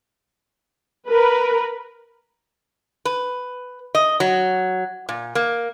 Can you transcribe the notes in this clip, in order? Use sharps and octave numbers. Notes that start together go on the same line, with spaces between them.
A#4 B4
B4
D#5
F#3
A#2
A#3